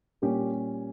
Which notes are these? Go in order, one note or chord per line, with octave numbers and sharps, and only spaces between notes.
A#2 G3 A#3 C#4 G4